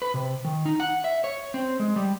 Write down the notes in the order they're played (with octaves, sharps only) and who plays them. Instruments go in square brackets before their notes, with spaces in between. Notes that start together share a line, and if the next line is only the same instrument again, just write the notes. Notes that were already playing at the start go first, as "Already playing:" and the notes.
[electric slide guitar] B4
C3
D#3
D#4
F#5
E5
C#5
C4
G#3
G3